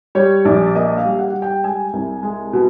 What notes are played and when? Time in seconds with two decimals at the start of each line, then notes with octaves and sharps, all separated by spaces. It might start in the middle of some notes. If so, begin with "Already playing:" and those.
0.15 G3 C#5
0.45 A#1 D5
0.75 A#3 D#5
0.97 F5
1.05 G3
1.19 F#5
1.34 G3
1.42 G5
1.64 G#3 G#5
1.93 C2
2.23 G#3
2.53 B2